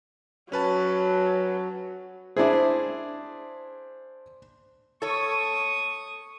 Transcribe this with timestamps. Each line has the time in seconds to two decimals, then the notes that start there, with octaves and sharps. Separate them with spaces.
0.52 F#3 C#4 B4 A5
2.37 D4 E4 G#4 C5
5.02 A4 C#5 C#6 D#6